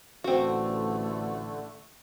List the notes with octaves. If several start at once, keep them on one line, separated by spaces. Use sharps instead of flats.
A1 D3 A3 C4 F#4